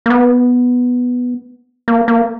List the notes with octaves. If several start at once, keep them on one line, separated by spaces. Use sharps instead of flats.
A#3
B3
A#3
A#3